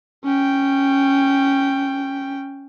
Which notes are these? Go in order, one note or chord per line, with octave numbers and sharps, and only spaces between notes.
C#4 G5